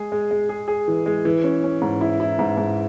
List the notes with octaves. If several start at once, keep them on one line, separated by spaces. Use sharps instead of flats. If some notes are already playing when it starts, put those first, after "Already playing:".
Already playing: G#3 G#4
G#3
G#3
G#4
G#4
E3
G#3
E3
C#4
C#4
G#2
E4
E4
G#2
G#2